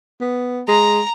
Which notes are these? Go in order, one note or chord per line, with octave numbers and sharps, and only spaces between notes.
B3
G#3 A#5